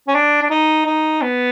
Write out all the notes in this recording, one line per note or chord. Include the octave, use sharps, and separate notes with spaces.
C#4
D4
D4
D#4
D#4
B3